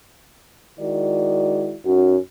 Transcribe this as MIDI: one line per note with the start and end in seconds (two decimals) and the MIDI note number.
0.79 1.77 51
0.79 1.77 56
0.79 1.77 64
0.79 1.77 66
0.79 1.77 74
1.85 2.17 42
1.85 2.17 61
1.85 2.17 63
1.85 2.17 66